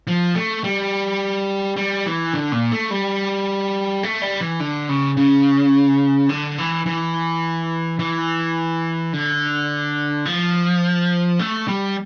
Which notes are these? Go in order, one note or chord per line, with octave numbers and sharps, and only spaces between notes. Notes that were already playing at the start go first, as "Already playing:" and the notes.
F3
A3
G3
G3
E3
D3
A#2
A3
G3
A3
G3
E3
D3
C#3
C#3
D3
E3
E3
E3
D3
F3
A3
G3